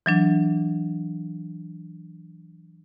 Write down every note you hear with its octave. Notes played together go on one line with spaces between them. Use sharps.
E3 F#3 D4